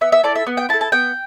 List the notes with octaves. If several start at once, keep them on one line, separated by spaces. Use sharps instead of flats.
B3 E5
E5
E4 A4 D5
E5
B3
G5
E4 A4 A5
A5
B3 G5